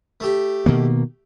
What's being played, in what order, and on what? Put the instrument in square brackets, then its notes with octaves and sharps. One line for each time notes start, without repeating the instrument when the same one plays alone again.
[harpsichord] A3 G4
[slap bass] B2 D#3 A#3